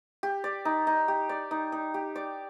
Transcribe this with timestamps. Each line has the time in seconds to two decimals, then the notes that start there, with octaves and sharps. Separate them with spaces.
0.23 G4
0.44 D5
0.65 D#4
0.87 D#4
1.08 G4
1.29 D5
1.51 D#4
1.72 D#4
1.94 G4
2.16 D5